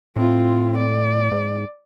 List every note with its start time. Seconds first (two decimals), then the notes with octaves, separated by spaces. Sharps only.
0.16 A2 C4 F4
0.78 D5
1.32 G#2